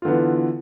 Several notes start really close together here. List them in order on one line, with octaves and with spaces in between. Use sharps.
F4 D3 B3 E3